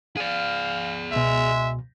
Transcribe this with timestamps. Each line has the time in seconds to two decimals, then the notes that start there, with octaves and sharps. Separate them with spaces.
0.17 G#4 D5 F5
1.12 C#2 B2 G#3 E5